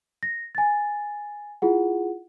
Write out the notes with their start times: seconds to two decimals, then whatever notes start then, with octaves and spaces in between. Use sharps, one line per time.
0.23 A#6
0.55 G#5 A6
1.62 E4 F4 G#4 F#5